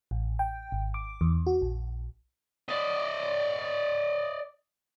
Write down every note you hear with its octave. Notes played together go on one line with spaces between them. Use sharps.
A1
G5
G#1
D6
E2
F#4
A#1
D5 D#5